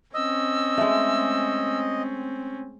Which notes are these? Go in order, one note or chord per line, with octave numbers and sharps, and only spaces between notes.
C4 C#4 D#5 E6
G#3 A3